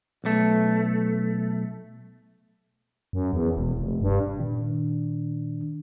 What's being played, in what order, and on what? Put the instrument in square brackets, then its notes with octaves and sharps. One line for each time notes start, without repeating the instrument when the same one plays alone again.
[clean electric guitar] B1 A3
[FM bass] F#2
E2
E1
F1
G2
[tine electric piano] A#2 D#3 D4